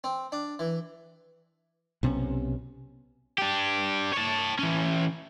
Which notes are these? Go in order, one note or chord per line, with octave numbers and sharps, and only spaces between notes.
C4
D4
E3
B1 C3 B3 C#4
D4 G4
C#5 A5
E3 C#4